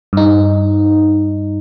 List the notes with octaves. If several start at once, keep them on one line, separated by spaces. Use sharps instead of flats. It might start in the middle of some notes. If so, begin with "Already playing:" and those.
G2 D#4